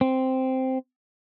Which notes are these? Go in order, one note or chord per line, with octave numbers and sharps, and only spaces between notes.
C4